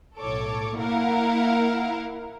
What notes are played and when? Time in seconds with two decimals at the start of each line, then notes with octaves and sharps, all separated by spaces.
0.18 B1 A2 A4 C#5 D6
0.78 A#3 E4 A#4 F5 F#5